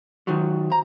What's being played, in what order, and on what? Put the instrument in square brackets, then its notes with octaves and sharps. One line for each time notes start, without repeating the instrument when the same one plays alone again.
[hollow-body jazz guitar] D#3 F#3 [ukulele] F4 F#4 C5
[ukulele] C5 A#5